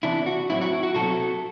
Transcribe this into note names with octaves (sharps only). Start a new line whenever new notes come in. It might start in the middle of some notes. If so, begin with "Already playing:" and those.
C3 E3 B3 D4 E4
F#4
A2 F#3 C4 E4
F#4
E4
F#4
B2 F#3 C4 F#4 A4